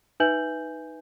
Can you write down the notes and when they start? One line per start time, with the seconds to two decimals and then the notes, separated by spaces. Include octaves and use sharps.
0.20 D#4 B4 E5 G#5 G6 F#7